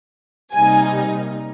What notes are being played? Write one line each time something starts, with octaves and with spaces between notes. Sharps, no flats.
C3 G3 A#3 D#4 G#5